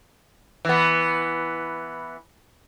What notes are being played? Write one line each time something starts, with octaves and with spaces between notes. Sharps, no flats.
E3 B3